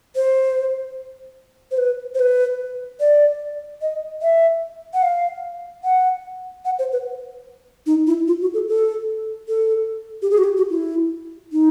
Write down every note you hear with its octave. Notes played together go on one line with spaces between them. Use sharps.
C5
C5
B4
C5
B4
D5
D#5
E5
F#5
F5
F#5
F#5
C5
B4
D#4
E4
F4
F#4
A4
A4
A4
G4
G#4
F#4
G4
F#4
E4
D#4